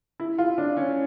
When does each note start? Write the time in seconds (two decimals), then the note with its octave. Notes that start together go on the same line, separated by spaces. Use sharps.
0.20 E4
0.38 F4
0.58 D4
0.77 C#4